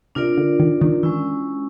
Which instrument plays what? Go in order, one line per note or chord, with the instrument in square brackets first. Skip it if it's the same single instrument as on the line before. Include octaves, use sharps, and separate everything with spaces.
[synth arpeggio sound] C3 [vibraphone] D4 F4 A#4 D5
[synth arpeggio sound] D3
D#3
D#3
[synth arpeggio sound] E3 [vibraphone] G#3 C#4 E4